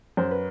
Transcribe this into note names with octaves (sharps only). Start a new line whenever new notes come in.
F#2 C5
B4